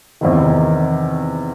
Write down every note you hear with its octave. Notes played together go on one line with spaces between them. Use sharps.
E2 C3 D#3